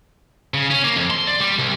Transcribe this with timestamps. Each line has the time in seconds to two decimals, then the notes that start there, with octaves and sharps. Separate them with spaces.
0.54 C#3
0.70 C#4
0.84 A#3
0.97 F2
1.10 C6
1.27 D5
1.41 G3
1.59 C2